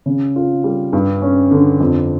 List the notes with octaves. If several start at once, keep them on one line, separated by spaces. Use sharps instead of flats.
C#3
F4
G3
G2
C#4
D3
F2